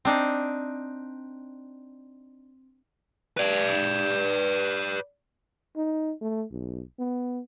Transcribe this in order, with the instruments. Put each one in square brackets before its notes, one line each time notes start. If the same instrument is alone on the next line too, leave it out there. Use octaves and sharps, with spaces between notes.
[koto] C4 D4 D#4
[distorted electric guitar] B4 D5
[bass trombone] D#4
A3
B1
B3